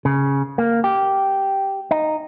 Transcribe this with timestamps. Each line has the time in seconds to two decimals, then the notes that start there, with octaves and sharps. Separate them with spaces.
0.05 C#3
0.58 A#3
0.84 G4
1.91 D#4